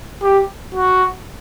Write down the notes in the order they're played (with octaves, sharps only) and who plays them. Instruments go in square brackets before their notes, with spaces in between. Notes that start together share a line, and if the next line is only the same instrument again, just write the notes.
[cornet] G4
F#4